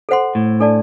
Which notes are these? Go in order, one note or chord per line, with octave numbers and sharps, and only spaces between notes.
A4 C5 F#5 C6
A2
D4 A4 D5 A5